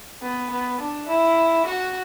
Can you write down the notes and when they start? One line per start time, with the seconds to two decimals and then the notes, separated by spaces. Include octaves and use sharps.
0.23 B3
0.51 B3
0.81 D4
1.09 E4
1.66 F#4